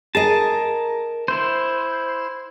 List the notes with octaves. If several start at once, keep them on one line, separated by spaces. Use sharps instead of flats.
G#4 A#4 D#5 A5
E4 C5